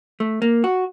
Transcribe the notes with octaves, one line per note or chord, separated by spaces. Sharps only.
A3
A#3
F#4